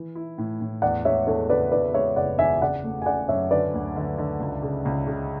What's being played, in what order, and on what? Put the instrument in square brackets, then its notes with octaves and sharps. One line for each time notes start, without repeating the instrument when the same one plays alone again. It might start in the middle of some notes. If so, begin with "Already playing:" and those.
Already playing: [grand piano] E3
E4
A2
A2
[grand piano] E2 [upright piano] D5 F#5
[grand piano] G#3 [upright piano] C#5 E5
[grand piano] E2 [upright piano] A4 C#5
[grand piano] C#3 [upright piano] B4 D5
[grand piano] E2 [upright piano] B4 D5
[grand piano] G#3 [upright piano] C#5 E5
[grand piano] F#1 [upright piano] D5 F#5
[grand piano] E2 [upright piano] E5 G#5
[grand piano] C#3 [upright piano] D5 F#5
[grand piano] A3
[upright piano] G#5
[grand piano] C#3 [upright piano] D5 F#5
[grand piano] F#2 [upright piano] C#5 E5
[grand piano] D3 [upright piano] B4 D5
[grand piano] D2
D3
D3
C#2
C#3
C#2
C#3